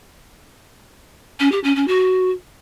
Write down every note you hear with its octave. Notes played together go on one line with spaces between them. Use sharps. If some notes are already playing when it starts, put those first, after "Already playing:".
C#4
G4
C#4
C#4
F#4